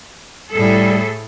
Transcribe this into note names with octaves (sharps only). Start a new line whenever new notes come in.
A2 G3 G#4 A4